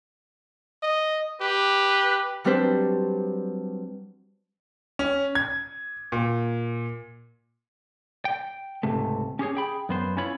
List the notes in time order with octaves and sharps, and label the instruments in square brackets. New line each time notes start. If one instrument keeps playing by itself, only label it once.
[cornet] D#5
[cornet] G4 [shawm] B4
[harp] F#3 G3 C4 D4 B4 C5
[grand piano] C#4
G#6
A#2
[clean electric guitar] G5
C#2 G#2 C3 A3
C#4 G4 G#4 C#5
G#4 G5 B5
F#2 B3 C5
C#4 E4 F4 C#5 B5